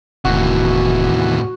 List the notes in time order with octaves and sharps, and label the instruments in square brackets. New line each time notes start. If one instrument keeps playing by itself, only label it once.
[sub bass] E1 [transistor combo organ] D#2 E3 [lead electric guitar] A2 C3 [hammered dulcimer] F#4